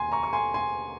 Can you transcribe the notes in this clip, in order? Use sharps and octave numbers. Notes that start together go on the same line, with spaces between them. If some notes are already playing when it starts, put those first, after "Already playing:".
Already playing: D#2 G#5 C6
A#5 C#6
C#6
G#5 C6
G#5 C6